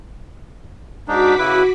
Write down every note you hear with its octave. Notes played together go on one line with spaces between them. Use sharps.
G#2 D4 D#4 F#4 D6 B6
C#3 E4 B4